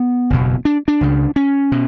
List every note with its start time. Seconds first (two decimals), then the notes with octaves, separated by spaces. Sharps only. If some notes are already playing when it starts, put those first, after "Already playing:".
Already playing: B3
0.30 F#1 E2 B2
0.65 D4
0.88 D4
1.01 C#2 C#3
1.36 C#4
1.72 B2